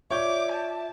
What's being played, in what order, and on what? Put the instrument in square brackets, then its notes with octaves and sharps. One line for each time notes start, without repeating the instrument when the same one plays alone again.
[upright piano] F4 D5 [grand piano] C#5 G6 [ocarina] E5 [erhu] D6
[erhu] A5